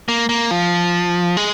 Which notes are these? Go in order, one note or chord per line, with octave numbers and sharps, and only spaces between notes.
A#3
A#3
F3
G#3